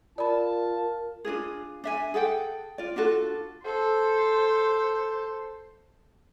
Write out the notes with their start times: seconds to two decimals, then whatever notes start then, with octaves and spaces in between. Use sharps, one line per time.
0.18 F4 A#4 D5 A5 B5
1.25 D4 D#4 F4 G#4
1.84 D4 E5 G#5
2.14 G#4 A4 F#5 G5
2.78 F4 D5
2.96 D4 F4 F#4 A4
3.63 A4 C5